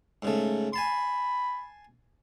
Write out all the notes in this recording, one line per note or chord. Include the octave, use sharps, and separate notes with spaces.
G#2 C#3 A3
G#5 A5 B5 C6